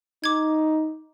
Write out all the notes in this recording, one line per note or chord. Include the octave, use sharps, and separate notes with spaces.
D#4 D6 G#6